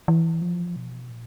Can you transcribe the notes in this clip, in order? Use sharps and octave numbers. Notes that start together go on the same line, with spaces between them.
E3
F3
B2
A#2